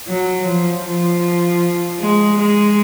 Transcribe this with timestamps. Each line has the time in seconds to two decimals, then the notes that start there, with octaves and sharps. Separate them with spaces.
0.08 F#3
0.46 F3
0.85 F3
2.00 G#3
2.38 G#3